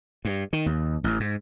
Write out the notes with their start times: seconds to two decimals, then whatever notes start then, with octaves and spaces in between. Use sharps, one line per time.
0.25 G2
0.53 D#3
0.66 D#2
1.04 A1
1.20 G#2